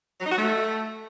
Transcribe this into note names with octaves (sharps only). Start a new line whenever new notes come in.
F#3
D#4
F#4
A3